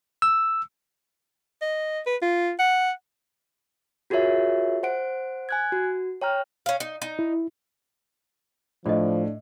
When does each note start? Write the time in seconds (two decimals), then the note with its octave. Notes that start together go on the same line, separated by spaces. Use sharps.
0.22 E6
1.61 D#5
2.06 B4
2.22 F4
2.59 F#5
4.10 F4 F#4 G#4 A#4 C#5 E5
4.83 C5 F#5 D7
5.49 G#5 F#6 G#6
5.72 F#4
6.21 C#5 G5 A#5 F6
6.66 C#4 F5
6.80 D#4
7.02 D#4
7.19 E4
8.86 A2 F3 D4 D5 D#5